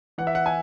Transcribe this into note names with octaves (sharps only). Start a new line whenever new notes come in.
E3 F#5
E5
F#5
G#5